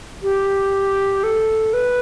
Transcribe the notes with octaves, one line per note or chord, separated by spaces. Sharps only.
G4
A4
B4